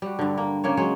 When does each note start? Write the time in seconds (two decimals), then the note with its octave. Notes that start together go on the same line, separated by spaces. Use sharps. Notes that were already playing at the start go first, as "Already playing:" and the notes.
0.02 G3 F#4
0.19 G2 D3
0.38 A#3
0.64 C#3 A#3 C#5
0.77 F#3 G#3 C#5